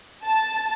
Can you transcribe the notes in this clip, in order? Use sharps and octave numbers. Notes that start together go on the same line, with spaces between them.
A5